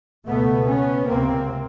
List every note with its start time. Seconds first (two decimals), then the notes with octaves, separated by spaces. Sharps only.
0.27 C#2 B2 A3 B3
0.67 B3 C#4
1.07 C#2 C3 A#3 C4